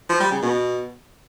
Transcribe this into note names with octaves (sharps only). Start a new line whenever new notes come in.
F3
G3
C#3
B2